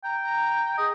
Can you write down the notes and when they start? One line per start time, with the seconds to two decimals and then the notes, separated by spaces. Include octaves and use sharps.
0.04 G5 A#5
0.23 A#5
0.78 G#4 D#5